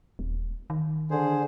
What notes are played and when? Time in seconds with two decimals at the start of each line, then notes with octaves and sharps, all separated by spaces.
0.19 D#1
0.70 D#3
1.11 D3 G#4 C5